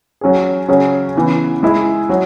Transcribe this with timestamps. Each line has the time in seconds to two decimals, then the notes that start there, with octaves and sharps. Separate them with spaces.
0.21 F#3 C#4 G#4
0.68 C#3 F#3 C#4 G#4
1.16 C#3 E3 B3
1.63 G#3 E4 G#4
2.09 F#3